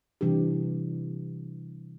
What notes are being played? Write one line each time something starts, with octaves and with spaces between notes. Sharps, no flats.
C3 E3 G3 D4 G4